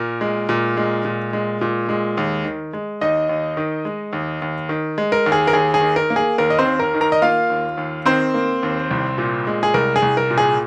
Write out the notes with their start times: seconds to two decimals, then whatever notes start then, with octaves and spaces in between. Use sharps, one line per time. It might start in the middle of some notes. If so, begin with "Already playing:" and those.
Already playing: A#2 A#4
0.21 G#3
0.49 A#2
0.77 G#3
1.05 A#2
1.33 G#3
1.61 A#2
1.89 G#3
2.17 D#2
2.44 D#3
2.73 G#3
3.01 D#2 D#4 D#5
3.29 D#2
3.57 D#3
3.85 G#3
4.13 D#2
4.42 D#2
4.69 D#3
4.98 G#3
5.12 A#4
5.26 D#2
5.32 G#4
5.47 A#4
5.53 D#2 G#4
5.74 G#4
5.81 D#3
5.96 A#4
6.10 A#3
6.16 G#4
6.38 D#2 A#4
6.50 D#5
6.59 C4 C5
6.65 D#2
6.79 A#4 A#5
6.94 D#3
7.01 A#4 A#5
7.12 D#5
7.22 A#3 F4 F5
7.50 D#2
7.77 D#2
8.05 D#3 C4 C5
8.34 A#3
8.63 D#2
8.91 C2
9.18 A#2
9.47 G#3
9.63 G#4
9.74 C2 A#4
9.96 G#4
10.02 C2
10.17 A#4
10.31 A#2
10.38 G#4